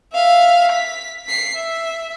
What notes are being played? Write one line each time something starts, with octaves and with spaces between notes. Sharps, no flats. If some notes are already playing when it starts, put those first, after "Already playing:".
E5 F5
B6
B6 C7
E5